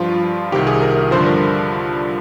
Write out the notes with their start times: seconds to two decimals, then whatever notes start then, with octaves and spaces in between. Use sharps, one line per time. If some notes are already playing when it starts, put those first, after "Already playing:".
Already playing: G2 F3 F4
0.52 C2 C3 D#3 G4
0.67 G#4
0.82 A#4
0.97 A#4
1.11 G2 D3 F3 C5
1.26 A#4